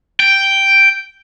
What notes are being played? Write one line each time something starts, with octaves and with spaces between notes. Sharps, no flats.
G5